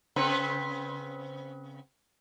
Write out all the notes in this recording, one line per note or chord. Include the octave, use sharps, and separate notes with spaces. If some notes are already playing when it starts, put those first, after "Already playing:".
C#3 C4 B4